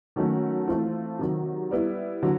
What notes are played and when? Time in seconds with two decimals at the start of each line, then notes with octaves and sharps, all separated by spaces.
0.16 D#3 F#3 A3 C#4
0.68 E3 A3 C4 F4
1.19 C3 D#3 F#3
1.71 G3 B3 E4
2.23 D3 F#3